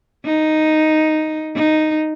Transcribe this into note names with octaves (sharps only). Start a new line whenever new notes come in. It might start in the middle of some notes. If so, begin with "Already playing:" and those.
D#4
D#4